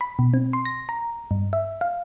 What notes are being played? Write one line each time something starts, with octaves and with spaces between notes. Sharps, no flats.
B5
B2
C4
C6
A#6
A#5
G2
E5
F5